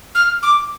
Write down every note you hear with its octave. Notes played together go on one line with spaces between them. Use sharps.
F6
D6